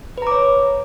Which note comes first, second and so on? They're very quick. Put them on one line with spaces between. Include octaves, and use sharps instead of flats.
B4 A#5 D6 C#5